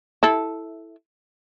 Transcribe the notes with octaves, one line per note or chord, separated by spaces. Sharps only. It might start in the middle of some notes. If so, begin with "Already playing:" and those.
E4 A4